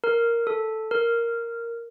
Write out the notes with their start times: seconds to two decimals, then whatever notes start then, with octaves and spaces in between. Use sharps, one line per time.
0.04 A#4
0.47 A4
0.91 A#4